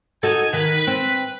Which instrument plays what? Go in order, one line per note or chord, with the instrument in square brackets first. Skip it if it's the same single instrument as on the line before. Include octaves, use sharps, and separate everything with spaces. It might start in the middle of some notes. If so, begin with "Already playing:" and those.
[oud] D#4 F#4 A4 [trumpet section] G#5
[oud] D#3 [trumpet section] B4
[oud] C4